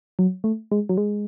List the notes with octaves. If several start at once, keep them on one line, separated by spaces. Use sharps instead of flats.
F#3
A3
G#3
F#3
G#3